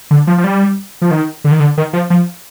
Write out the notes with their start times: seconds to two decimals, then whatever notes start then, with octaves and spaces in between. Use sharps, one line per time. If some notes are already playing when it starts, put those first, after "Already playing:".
0.11 D3
0.27 F3
0.38 F3
0.44 G3
1.02 F3
1.11 D#3
1.44 D3
1.52 D#3
1.60 D3
1.77 D#3
1.93 F3
2.10 F3